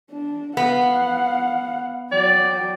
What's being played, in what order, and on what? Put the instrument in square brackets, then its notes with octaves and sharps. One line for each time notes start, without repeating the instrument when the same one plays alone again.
[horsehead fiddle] D4
[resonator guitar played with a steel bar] B3 [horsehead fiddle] F5 F#5
[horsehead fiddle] F#3 G5 [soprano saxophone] D5